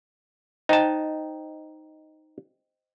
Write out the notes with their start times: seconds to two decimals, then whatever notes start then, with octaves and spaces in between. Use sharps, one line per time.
0.69 D#4 C5 D#5 G5 A5